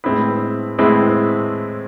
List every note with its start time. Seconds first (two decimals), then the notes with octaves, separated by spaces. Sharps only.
0.04 A2 G#3 C4 E4 B4
0.79 A2 G#3 C4 E4 B4